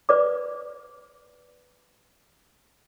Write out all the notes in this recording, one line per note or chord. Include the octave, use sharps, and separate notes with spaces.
B4 D5 D6